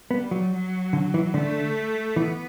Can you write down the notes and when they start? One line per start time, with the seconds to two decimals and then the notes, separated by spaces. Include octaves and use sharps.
0.11 G3 B3
0.31 F#3
0.52 F#3
0.93 D3
1.14 E3
1.34 D3 A3
2.16 E3 B3